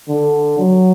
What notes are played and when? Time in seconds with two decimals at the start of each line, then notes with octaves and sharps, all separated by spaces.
0.09 D3
0.58 F#3